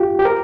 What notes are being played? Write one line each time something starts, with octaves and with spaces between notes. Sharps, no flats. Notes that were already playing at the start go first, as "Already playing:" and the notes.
Already playing: F4 G4
G4
A#4